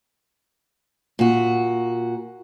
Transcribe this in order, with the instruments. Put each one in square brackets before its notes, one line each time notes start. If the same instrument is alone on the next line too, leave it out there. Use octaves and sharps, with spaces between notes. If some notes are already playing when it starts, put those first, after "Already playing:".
[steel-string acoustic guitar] A#2 F#4